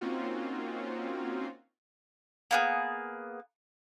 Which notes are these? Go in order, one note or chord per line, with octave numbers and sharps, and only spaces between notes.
A#3 C4 C#4 D#4 F4 F#4
A#3 B3 G#4